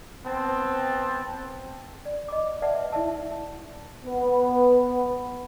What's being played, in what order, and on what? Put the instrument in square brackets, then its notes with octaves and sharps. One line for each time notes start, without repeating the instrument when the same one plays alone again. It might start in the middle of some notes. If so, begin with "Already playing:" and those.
[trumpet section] B3 C4 A5
[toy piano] D5
D#5 B5 D6
B4 D5 E5 F#5 A5
E4 E5 F#5 A5
[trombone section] B3